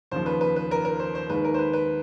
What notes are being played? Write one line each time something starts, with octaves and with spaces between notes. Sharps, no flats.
D#2 C#3 F3 C5
B4
B4
B4
A#4
A#4
C5
C5
D#2 D#3 G#3 B4
A#4
C5
B4
B4